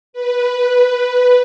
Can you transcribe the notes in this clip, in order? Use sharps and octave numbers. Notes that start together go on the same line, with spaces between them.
B4